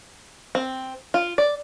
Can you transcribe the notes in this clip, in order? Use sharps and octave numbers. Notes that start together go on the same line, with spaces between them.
C4
F4
D5